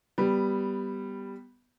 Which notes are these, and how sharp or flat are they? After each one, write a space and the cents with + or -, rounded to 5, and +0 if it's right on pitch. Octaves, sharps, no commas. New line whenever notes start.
G3 +0 B3 +0